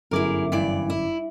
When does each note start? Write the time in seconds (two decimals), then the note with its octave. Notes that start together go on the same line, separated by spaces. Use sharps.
0.11 G1 F#2 E4 G#4 A#4 D6
0.52 G2 E3 D5
0.90 E4